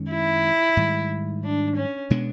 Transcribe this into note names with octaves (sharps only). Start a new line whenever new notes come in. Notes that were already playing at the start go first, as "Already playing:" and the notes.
Already playing: F#2 D#3 G#3 C#4
E4
G#2 D#3 G3
D4
C#4
B2 G#3 B3 D4